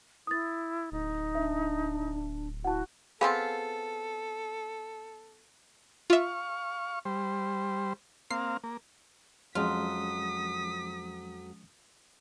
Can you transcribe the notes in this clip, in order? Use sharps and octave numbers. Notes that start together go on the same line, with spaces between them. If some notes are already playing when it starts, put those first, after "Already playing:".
E4 D#6 A6
D1 D#4
D4 E5
E4 F#4 F#5 A5
B3 C4 F4 G#4 A4 F5 G#5
F4 E5 F5 C#6
G3 C5
A#3 C4 F5 C7
A#3
F2 F3 F#3 G#3 C#4 F4 D#6 B6